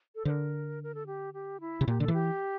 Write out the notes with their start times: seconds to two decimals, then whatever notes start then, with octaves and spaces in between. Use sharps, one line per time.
0.15 A4
0.25 D3 C5
0.30 A#4
0.83 A#4
0.95 A4
1.06 G4
1.34 G4
1.61 E4
1.81 C3
1.88 A#2 G4
2.00 D3 A4
2.08 E3
2.13 G4